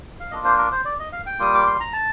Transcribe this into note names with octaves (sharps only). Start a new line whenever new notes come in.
F5
A#3 D4 F4 D#5
C5
A#4
C5
D5
D#5
F5
G5
G3 A#3 F4 D#6
D6
C6
A#5
A5